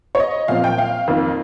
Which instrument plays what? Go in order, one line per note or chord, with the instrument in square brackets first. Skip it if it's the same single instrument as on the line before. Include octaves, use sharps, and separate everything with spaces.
[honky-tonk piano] C#5
D#5
A#2 F3 C4 F5
G5
F5
F2 D#3 A#3